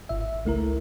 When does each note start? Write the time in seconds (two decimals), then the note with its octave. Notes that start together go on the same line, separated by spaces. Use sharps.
0.09 G#1 E5
0.45 C#2 A3 E4 A#4